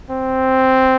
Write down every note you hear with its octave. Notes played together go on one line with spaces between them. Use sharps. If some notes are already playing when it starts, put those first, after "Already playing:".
C4